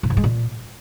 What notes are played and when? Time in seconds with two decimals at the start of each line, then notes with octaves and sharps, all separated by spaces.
0.03 A2
0.10 G#2
0.17 G#3
0.24 A#2